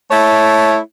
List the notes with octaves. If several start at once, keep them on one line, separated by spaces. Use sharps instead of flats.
A3 E4 C#5